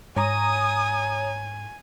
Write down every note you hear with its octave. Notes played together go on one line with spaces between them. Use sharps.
G#2 C#5 G#5 A#5 D#6